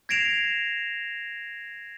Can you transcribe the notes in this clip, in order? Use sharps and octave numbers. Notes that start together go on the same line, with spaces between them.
G#6 A#6 C7 D7 E7 F7